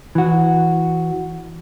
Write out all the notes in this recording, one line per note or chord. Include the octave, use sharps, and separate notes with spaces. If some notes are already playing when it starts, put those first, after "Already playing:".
E3 F#4